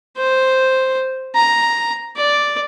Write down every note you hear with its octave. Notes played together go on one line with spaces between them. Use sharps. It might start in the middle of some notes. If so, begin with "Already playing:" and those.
C5
A#5
D5